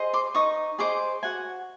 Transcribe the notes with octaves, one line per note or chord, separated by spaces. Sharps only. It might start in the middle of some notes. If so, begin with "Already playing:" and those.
Already playing: G#4 C5 D#5
C6 D6
D#4 C#6 D#6
G#4 C5 D#5 C6 D6
F#4 F#5 G#5